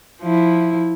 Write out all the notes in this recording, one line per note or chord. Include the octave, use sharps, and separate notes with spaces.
F3 E4